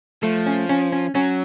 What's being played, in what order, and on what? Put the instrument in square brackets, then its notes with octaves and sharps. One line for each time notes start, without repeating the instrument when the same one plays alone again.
[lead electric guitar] F3 [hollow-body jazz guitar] A3
[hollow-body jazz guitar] C#4
C#4
C#4
[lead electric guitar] F#3 [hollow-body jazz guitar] C#4